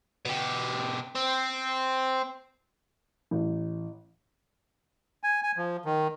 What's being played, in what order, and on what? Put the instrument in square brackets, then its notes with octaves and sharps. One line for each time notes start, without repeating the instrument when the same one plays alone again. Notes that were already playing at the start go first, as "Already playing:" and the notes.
[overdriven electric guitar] B2 G4
C4
[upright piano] A1
[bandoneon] G#5
G#5
F3
D#3